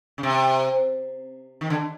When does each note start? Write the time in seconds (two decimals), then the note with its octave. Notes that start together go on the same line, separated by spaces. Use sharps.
0.18 C#3
0.23 C3
1.61 D#3
1.70 D3